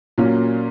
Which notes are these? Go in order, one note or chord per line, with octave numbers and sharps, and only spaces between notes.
A#2 F#3 A#3 C#4